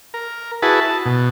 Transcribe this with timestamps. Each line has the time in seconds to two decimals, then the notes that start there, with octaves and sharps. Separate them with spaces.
0.14 A#4
0.62 E4 F#4 G#4 B4 A5
0.81 A5
1.06 B2